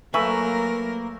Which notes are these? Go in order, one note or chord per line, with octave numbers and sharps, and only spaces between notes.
F#3 A3 A#3 A#4 B4 G#5 C#6 E6